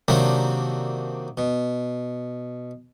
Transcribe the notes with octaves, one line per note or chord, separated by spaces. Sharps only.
C3 D#3 F#3 A#3 C4 D4
B2